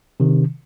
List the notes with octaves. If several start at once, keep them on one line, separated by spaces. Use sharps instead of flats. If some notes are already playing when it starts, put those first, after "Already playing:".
C3 D#3